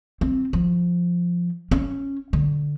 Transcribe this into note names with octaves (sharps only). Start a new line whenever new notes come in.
C4
F3
C#4
D3